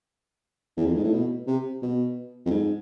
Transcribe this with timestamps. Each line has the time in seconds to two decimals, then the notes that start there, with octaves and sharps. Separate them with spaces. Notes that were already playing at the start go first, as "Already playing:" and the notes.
0.77 E2
0.86 F2
0.95 G#2
1.04 A2
1.14 B2
1.47 C3
1.82 B2
2.46 F2
2.51 G#2